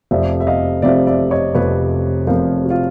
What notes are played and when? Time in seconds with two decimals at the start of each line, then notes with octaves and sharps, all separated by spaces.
0.11 F1 F2 C3 F3 D5 E5
0.40 E5
0.47 D#5 F5
0.82 F1 F2 C3 F3 D5 E5
1.07 D5 E5
1.31 C#5 D#5
1.55 F1 F2 C3 F3 B4 C#5
2.27 F1 F2 C3 F3 A#4 C5
2.64 F#4
2.70 F4